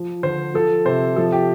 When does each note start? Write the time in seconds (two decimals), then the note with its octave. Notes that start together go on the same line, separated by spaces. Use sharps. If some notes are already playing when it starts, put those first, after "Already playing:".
Already playing: F3
0.23 D3 C5
0.54 F3 A4
0.85 C3 C5
1.16 F3 A4
1.32 G4